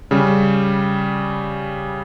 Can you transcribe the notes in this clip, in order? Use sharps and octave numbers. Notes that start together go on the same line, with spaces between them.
C#3 G3